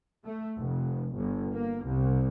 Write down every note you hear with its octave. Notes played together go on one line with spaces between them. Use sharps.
A3
F1
G1
A#3
C2